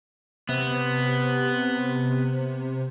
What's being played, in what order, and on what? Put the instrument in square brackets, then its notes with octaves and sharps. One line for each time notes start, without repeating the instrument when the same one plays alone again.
[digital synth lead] C3 [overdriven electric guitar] B3